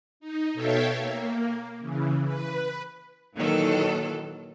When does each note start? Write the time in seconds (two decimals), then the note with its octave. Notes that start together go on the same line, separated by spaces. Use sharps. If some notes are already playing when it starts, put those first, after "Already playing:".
0.20 D#4
0.53 B2 A4 C#5 E5 F5 G5
0.99 A#3
1.79 C#3 E3
2.23 B4
3.36 A#2 D#3 E3 F#3 A4